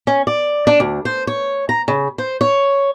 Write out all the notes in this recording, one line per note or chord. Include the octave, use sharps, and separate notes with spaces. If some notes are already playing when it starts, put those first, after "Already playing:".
C#4
D5
D4
D2
C5
C#5
A#5
C#3
C5
C#5